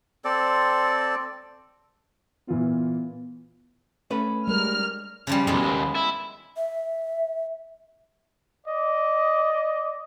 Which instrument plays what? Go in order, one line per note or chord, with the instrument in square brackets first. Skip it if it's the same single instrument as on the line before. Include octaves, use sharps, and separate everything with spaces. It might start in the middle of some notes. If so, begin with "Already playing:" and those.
[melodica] C4 A4 D5
[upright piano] A#2 E3 F4 [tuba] B3
[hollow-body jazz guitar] A3 C#4 B4
[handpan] G3 G#3 A#4 [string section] F6
[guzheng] C#3 F3 G3
[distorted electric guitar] B1 F2 [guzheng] G#3 B3
[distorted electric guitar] D#2
E4
[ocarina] E5
[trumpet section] D5 D#5